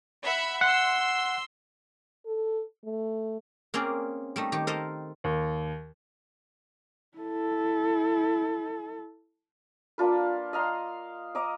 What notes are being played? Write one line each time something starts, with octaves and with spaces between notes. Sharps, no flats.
E5 F#5 B5
F#5 C6 E6
A4
A3
A#3 C4 C#4 G#4 D5
G3 A3 D#4
D#3 G4
A4 A#4 C5 D#5 F5
D#2
E4 A4
A#3 D4 F4 B4
D#5 F5 A#5 C6
D#5 A#5 D6